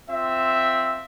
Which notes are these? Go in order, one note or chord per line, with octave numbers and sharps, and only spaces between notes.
C4 F4 E5